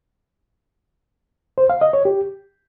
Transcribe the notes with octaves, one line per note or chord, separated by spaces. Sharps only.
C5
F5
D#5
C#5
G4